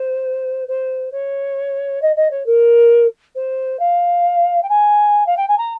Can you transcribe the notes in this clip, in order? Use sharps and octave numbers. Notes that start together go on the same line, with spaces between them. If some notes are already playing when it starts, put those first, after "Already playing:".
Already playing: C5
C5
C#5
D#5
D#5
C#5
A#4
C5
F5
G5
G#5
F5
G5
G#5
A#5